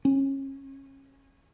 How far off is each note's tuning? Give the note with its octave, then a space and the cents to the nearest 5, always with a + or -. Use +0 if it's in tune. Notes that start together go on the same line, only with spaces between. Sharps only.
C#4 -30